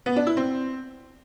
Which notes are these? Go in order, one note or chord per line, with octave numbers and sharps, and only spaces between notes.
B3
D4
E4
C4